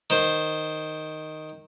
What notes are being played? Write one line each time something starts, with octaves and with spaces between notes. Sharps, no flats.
D#3 C5